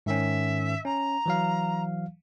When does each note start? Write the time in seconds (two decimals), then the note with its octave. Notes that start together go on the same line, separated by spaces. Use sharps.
0.06 G#2 D#3 C#4 E5
0.85 C#4 A#5
1.26 E3 F#3 F5